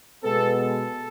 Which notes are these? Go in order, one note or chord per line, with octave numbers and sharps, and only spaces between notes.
B2 G#3 B3 A4
A4